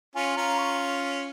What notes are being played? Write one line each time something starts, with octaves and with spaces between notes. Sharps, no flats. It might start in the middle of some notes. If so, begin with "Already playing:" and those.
C#4 F4 G#5
C#4 F4 A#5
C#6